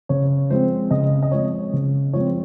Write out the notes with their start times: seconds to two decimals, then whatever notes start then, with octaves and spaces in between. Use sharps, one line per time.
0.09 C#3 C#5
0.50 F3 G#3 C4 C5
0.91 C#3 D#5
1.23 D#5
1.32 F3 G#3 C4 C#5
1.73 C#3
2.13 F3 G#3 C4 C#5